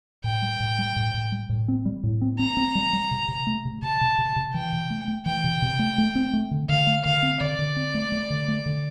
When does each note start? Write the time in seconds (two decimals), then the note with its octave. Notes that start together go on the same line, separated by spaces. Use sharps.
0.24 A2 G5
0.42 G3
0.60 A2
0.79 G3
0.96 A2
1.14 A2
1.32 G3
1.49 A2
1.68 C4
1.85 G3
2.03 A2
2.21 C4
2.39 C4 A#5
2.57 C4
2.75 G3
2.93 G3
3.11 C3
3.28 C3
3.47 A3
3.65 C3
3.82 C3 A5
4.01 C3
4.18 C3
4.36 C3
4.54 E3 G5
4.73 C3
4.90 A3
5.08 A3
5.26 E3 G5
5.44 C3
5.62 C3
5.79 A3
5.98 A3
6.15 C4
6.33 A3
6.51 D3
6.69 D3 F5
6.87 A3
7.05 D3 F5
7.23 C4
7.41 D3 D5
7.59 D3
7.76 C4
7.94 A3
8.12 A3
8.30 D3
8.48 A3
8.66 D3